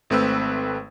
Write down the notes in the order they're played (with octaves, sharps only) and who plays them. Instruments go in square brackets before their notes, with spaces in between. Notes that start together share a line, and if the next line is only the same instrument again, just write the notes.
[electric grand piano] G#1 A3 C4 B4 E6